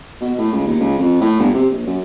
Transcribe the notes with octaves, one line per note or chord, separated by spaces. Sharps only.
B2
A2
C#2
D#2
C#2
F2
A2
G1
C3
A#1
F#2